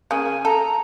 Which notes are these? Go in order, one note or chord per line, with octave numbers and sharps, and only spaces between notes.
C#3 A#3 G#5
A4 A#5